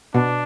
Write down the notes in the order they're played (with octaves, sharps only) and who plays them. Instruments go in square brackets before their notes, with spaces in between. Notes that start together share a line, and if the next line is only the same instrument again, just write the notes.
[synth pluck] B2 [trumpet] D4